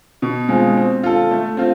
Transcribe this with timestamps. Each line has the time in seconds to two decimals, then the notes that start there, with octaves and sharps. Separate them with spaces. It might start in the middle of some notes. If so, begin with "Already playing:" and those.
0.22 B2
0.49 G#3 C4 F4
0.77 C4
1.03 F4 A4
1.31 A3
1.57 C4 F4